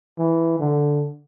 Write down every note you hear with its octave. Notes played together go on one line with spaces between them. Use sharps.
E3
D3